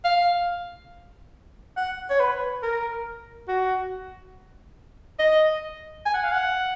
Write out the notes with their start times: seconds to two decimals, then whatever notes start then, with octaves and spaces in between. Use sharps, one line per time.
0.04 F5
1.77 F#5
2.10 C#5
2.19 B4
2.63 A#4
3.48 F#4
5.19 D#5
6.06 G#5
6.14 F#5
6.23 F5
6.32 F#5